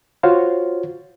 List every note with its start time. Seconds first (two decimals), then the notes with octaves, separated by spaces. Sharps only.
0.23 F4 F#4 C5 C#5 F5